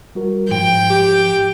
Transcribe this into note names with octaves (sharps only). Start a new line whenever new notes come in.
G3 F#4 A#4
G#2 F3 G5
G4